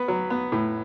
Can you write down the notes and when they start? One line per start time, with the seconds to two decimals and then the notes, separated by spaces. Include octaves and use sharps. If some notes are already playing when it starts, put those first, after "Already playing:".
Already playing: B3 B4
0.08 F#3
0.30 B3
0.52 A2